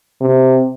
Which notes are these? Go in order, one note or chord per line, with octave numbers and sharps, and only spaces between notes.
C3